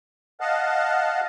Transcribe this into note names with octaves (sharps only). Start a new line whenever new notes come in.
D#5 F5 F#5 A5